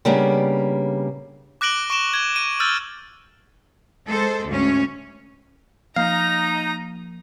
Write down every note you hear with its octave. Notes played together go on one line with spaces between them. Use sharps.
C#3 G3 A#3 B3 D4
D6 F#6 A#6 D7 F#7 G7
C#6 D7 E7 G7
G#6 D#7 G7
D#7 E7
E6 F6 G6 A6 D#7
G#3 A4 C5
D2 G#2 C#4
F3 A#3 D#4 F5 A#5